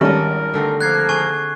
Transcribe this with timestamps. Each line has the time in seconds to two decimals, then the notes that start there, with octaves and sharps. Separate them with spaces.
0.01 G#1 G3 C#4 A4 A#4 D#5
0.54 D3 A3 C4
0.81 F3 A#3 F#6 G#6 C7
1.09 G#4 G#5 C#6